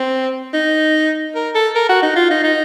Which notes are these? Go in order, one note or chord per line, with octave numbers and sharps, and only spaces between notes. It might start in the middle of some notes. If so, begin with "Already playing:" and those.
Already playing: C4
D#4
A#4
A4
A#4
F#4
D#4
F4
D#4
D#4